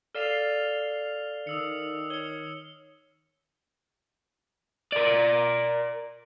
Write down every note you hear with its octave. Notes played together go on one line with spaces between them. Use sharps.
A4 D5 F5 F6 C7 F7
D#3 D#6 E6 C#7
C#5 C#7 G7
A#4 D5